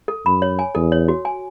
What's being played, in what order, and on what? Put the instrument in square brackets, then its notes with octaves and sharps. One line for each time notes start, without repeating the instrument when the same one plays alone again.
[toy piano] A4
[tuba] F#2 [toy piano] B5
[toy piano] C#5
G#5
[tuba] E2 [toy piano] A4
[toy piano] C#5
F#4
G#5